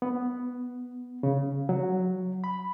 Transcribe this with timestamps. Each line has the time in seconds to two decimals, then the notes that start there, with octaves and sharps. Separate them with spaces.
0.02 B3
1.23 C#3
1.69 F#3
2.44 B5